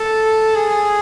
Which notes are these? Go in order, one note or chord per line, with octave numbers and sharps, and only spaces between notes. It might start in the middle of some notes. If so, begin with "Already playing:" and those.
Already playing: A4
G#4